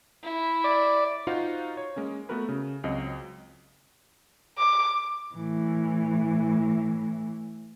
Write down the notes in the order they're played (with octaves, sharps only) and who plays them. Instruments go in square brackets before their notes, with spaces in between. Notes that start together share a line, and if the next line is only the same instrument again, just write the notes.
[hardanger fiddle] E4
[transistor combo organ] D5
[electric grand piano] D#4 F4 F#4 C5 F5 F#5
C#5
G#3 A#3 C#4
A3 B3 F#4 A#4 B4
C#3
C#2 F#3 C4 D#5
[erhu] D6
[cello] A2 E3